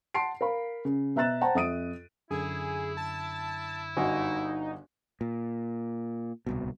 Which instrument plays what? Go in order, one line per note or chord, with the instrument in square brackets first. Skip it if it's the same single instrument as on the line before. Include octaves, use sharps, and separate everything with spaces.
[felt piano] F#5 A5 C6 C7 D7
A#4 F5 B5
C#3
B2 E5 A#5 F#6 A6 E7
C5 F#5 G5 A5 A#5
F2 E5 D#6 D7 D#7
[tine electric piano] F#2 D3 [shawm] E4 [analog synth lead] G#4
[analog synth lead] A5
[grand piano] G1 F#4 G#5 [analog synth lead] D#4
[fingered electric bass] A#2
D1 C2 B2